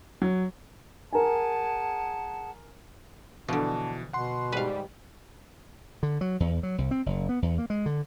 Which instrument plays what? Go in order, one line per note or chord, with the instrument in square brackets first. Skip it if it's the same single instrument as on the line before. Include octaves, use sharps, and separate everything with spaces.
[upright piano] F#3
[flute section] G#4 F#5 A5 [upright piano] A#4 G#5
[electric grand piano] B2 E3 [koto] D3 F3 [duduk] D4
[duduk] B2 [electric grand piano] F#5 C6
[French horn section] G#2 G3 [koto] B4 F5
[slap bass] D3
F#3
E2
F#3
C2
C4
F#1
B3
E2
A#3
G#3
D3